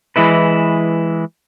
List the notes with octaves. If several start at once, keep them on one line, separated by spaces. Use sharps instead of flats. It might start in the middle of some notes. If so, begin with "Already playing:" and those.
E3 G#3 E4 B4